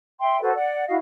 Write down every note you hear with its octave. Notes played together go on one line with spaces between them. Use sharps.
E5 G5 C6
F#4 A4 B4 C5
D5 F#5
E4 F#4 D#5 F5